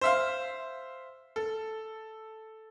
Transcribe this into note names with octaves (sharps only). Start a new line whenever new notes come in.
C5 E5 F5
A4